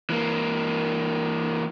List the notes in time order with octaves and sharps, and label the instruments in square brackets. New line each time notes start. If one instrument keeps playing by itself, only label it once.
[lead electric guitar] E3 A#3